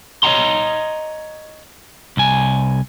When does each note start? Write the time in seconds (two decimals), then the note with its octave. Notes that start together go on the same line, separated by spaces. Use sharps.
0.23 C#5 D#5 F5 F#5 A#5 C6
2.17 C2 G#5